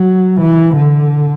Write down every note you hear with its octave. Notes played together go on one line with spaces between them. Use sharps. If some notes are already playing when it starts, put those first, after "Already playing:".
Already playing: F#3
E3
D3